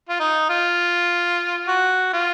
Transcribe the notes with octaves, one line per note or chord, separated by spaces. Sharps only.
F4
D#4
F4
F#4
F4